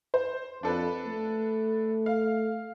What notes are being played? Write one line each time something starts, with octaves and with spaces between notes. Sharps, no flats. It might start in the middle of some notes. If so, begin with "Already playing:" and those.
C5
F2 D4 A4 B4
A3
F5